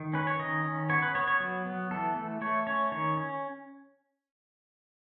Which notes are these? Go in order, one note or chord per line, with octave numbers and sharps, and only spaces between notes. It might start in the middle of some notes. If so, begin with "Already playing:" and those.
Already playing: D#3
C#4 B4
C#5
D#3 D#5
C#4
B3 C#5
B4
B3 C#5
C#5
F#3
B3
E3 A4
A3
A3 C#5
C#4 C#5
D#3 C#5
C#4